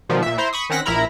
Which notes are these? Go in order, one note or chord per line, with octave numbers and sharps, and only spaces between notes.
B2 D#3 F3 G3
A#2 E5
E4 C5 A#5 C6
B5 C#6 D#6
D#3 C4 C#4 F#5 A#6 B6
A#1 A#2 E4 A#4 A#5 B5